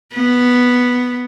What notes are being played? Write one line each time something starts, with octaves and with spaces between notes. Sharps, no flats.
B3